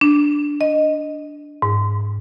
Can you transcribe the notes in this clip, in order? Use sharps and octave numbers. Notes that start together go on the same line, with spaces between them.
D4
D#5
G#2